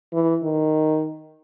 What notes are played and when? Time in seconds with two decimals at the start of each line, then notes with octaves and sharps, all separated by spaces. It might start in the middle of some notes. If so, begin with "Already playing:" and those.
0.13 E3
0.43 D#3